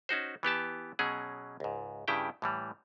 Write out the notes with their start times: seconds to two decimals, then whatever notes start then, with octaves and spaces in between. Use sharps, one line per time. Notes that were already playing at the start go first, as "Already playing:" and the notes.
0.09 C#4 D#4 F#4 C5
0.43 E3 B3 G4 A5
0.99 B2 F#3 C#4 G#4
1.60 C#2 G#2
2.08 G2 C#3 E4 G4 G5
2.42 A2 E3 G3